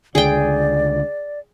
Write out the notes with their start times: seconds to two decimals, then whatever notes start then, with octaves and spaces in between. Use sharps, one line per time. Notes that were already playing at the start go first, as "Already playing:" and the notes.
0.15 C#2 D3 G#4 D5 G5